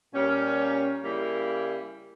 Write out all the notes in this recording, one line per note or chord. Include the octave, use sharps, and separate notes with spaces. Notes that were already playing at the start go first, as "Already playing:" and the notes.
A#2 G3 C#4 G4 A#4
C#3 G3 A#3 E4 G#4